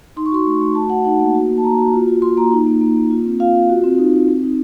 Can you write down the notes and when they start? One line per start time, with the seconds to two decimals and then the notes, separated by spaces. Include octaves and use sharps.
0.17 D#4 C6
0.26 C#6
0.32 F#4 C6
0.46 A3
0.61 A3
0.75 F#4 A5
0.90 F#4 F#5
1.05 D#4 F#5
1.20 A#3
1.35 F#4
1.49 A#3
1.58 A5
1.64 A#3 A#5
1.78 F#4
1.93 F4
2.07 F4
2.22 F4 C6
2.37 A#3 A#5
2.52 D#4
2.67 A#3
2.81 A#3
2.96 A#3
3.11 F4
3.25 C4
3.40 F4 F5
3.55 F4
3.69 F#4
3.84 C4
3.98 D#4
4.14 C4
4.28 C4
4.43 D#4